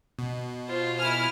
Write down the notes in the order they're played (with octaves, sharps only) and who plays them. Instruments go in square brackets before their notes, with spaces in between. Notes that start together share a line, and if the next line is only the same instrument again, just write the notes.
[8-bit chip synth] B2
[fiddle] F4 C5
[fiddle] E4 G#5 [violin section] F6